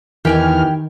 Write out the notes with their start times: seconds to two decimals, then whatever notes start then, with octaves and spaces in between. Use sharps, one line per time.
0.25 E2 D#3 E3 G4 G5 G#5 F6